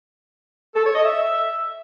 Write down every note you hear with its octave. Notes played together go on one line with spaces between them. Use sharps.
A4
C#5
D#5
E5